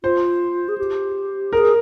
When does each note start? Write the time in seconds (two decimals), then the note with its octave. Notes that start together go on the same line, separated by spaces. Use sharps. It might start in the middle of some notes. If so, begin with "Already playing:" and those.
0.04 F4 C5
0.69 G#4
0.78 G4
1.53 G#4 A#4